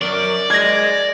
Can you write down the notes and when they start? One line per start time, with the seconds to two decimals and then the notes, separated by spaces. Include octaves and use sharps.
0.02 F#3 A#4 D5
0.50 G#4 D#5 G#6 A#6